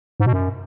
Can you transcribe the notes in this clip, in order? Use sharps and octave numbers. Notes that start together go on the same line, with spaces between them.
G#2
B2
F#2